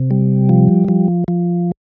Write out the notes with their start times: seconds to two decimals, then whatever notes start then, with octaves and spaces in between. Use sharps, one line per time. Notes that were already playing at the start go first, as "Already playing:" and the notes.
Already playing: C3
0.11 G3
0.49 F3
0.88 F3
1.28 F3